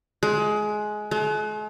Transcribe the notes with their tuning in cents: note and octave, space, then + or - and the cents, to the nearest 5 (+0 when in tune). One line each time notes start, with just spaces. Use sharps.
G#3 +20
G#3 +45